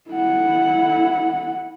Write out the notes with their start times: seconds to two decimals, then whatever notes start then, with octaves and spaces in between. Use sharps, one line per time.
0.10 E4 F#5